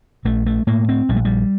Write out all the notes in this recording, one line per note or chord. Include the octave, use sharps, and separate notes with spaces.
A#1 A3
A3
A2 A#3
C4
A#1 G3
A3
G3